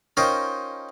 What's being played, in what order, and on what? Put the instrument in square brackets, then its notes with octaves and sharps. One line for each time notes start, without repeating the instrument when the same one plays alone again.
[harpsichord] C#4 D#4 F4 A#4 C5 G5